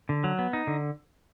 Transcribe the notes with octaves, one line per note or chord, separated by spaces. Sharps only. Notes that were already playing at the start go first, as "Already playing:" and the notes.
D3
F#3
B3
D#4
D3